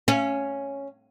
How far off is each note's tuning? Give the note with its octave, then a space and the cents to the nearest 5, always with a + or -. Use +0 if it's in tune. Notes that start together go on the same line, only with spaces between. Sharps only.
C#4 +0 F5 -45